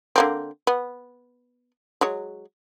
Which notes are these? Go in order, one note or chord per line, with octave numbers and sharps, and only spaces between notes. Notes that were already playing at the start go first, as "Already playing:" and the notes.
D3 A#3 C4
B3
F#3 G#3 C#5